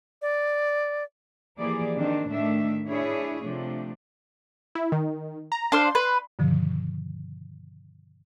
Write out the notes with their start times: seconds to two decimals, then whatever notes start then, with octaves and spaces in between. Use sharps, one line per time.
0.22 D5
1.59 E3 F3 A#3 G4 G#4 D5
1.97 D#3 C4 D4
2.30 A2 D#3 A3 D4 E5
2.87 D4 E4 G#4 C#5
3.43 C3 F3 A3 D4
4.75 E4
4.92 D#3
5.52 A#5
5.72 D4 C5 F5 C6
5.95 B4
6.39 G2 B2 D3 D#3 F3